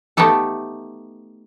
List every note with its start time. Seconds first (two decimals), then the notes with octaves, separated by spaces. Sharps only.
0.17 A3 B3 D#4 G4 A4